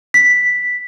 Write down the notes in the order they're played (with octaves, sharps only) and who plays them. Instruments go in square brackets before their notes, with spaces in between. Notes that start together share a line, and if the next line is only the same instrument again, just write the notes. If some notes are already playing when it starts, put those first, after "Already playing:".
[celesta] B6